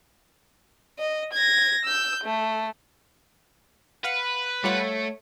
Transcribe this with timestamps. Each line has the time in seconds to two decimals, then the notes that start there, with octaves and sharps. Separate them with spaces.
0.99 D#5
1.33 G#6 A#6
1.85 E6 G6
2.23 A3
4.04 B4 F5 F#5
4.64 G3 A3 F4 C#5 F#5